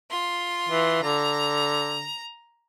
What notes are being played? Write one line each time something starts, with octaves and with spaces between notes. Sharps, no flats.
F4 C6
E3
D3 A#5